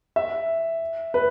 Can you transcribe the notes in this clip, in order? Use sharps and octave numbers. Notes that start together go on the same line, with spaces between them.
E5
B4